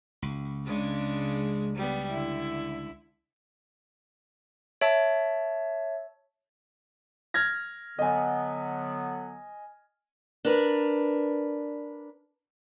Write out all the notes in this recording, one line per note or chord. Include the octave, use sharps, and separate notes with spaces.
C#2
C#3 G#3 D4
G3 B3
D3 E4
C#5 E5 A5
F6 G#6 A#6
D3 F#3 B3 D#5 G#5
D4 A#4 B4